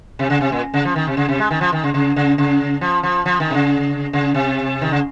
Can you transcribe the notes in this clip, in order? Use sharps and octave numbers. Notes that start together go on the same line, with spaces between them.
C3
C#3
C3
A#2
C#3
F3
D#3
C3
C#3
C3
G#3
D#3
F3
D#3
C#3
C#3
C#3
C#3
F3
F3
F3
D#3
C3
C#3
C#3
C3
D#3
C#3